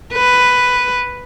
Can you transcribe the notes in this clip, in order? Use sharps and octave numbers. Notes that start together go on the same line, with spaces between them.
B4